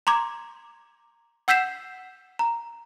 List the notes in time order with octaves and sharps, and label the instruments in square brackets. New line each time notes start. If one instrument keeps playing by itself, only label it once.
[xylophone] A#5 C6 D6 G#6
F#5 E6 G6 B6 C7 E7
A#5